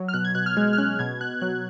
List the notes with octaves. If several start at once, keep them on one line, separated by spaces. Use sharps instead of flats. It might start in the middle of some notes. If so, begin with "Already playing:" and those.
Already playing: F#3
F6
B2 F#6
G#6
B2 F#6
F6
G#3 G#6
F6
C#4 F#6
B2 G#6
B2 F#6
F#3 F#6